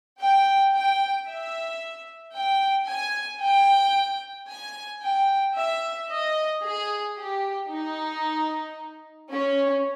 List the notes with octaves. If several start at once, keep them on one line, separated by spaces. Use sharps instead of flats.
G5
G5
E5
G5
G#5
G5
G#5
G5
E5
D#5
G#4
G4
D#4
C#4